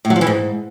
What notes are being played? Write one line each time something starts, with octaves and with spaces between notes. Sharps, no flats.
A2
F#3
F3
E3
G#2